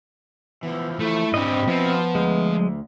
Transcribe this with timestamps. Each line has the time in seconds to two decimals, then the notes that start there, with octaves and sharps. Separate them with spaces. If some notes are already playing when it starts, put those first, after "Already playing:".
0.63 E3 F3 B3
1.00 A3 E4
1.34 G#2 C4 D4 G4 B4 D#5
1.68 F3 B3 E4 F#4
2.15 D2 G#3